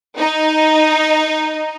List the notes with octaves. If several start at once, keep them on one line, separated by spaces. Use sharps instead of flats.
D#4